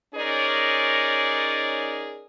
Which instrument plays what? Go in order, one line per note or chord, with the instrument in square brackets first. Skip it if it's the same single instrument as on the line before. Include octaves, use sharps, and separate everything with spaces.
[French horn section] C#4 D#4 G#4 A#4 C#5 D5